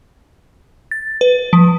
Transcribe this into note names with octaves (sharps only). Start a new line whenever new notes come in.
A6
B4
F3